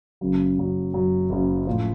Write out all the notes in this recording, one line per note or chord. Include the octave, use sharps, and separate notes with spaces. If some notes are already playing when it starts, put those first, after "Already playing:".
F#1 F#2 C#3 F#3
F#1 F#2 C#3 F#3
F#1 F#2 C#3 F#3
F#1 F#2 C#3 F#3
A2 F3